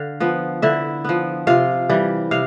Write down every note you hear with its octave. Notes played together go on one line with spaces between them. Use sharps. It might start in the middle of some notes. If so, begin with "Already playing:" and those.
Already playing: D3 F5
F3 B3
D3 E4 E5
F3 B3
C3 F4 F5
E3 G3
C3 F5